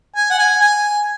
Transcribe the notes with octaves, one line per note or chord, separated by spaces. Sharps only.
G#5
F#5
G#5
G#5